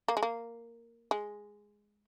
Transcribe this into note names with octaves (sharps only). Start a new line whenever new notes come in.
A#3
G#3
A#3
G#3